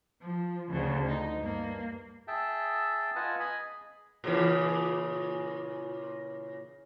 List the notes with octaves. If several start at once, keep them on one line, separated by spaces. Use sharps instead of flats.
F3
D2 C#3
D#4
G2 A#3
G#4 E5 G5 A5
F4 B4 D#5 F#5 G#5 A5
D#5 G#5 B5
G#4
A#2 C#3 E3